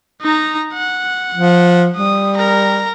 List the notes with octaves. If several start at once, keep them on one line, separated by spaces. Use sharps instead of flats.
D#4 A#5
F#5
F3
G3 D#6
A#4 A#5